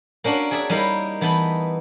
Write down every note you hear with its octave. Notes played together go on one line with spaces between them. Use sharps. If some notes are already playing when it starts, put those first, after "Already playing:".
A#3 C#4 D4 F#4
G#4 C#5 D5 E5
G3 A#3 D#4 E4
E3 B3 D#4 A5 B5